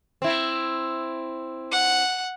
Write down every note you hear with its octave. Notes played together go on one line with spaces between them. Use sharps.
C4 E4
F#5